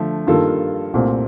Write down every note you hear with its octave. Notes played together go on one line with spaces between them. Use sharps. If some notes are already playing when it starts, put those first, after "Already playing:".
Already playing: D3 F3 A3
G2 D#3 A#3 F4 A4
C2 A#2 A3 C4